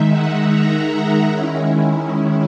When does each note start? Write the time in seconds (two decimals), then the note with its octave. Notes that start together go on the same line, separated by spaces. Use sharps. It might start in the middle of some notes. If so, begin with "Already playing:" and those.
Already playing: D#3 G#3 D#4 E5
0.12 F#5
0.50 A#5
1.28 D#3 G#3 C#4 E4